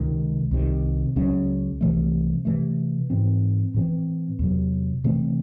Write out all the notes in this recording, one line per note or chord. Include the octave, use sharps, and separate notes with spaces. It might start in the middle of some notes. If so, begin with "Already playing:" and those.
Already playing: C#2 C3 D#3 G#3
C2 C3 D#3
C#2 C#3 F#3 C#4
C2 C3 E3 A3
C3 E3 A3
G#2 E3 C4
A2 E3 C4
E2 C3 F#3
C3 E3 A3 C4